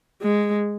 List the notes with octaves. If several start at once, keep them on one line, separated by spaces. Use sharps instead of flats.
G#3